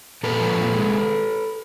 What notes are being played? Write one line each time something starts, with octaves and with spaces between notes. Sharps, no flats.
A#2 A4 B4
F3
A#2
G#3